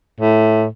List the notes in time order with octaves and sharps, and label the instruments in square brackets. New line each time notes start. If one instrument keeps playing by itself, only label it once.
[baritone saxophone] A2